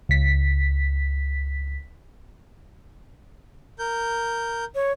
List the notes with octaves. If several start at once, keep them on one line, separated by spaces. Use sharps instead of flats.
C#2 B6
A#4 G6
C#5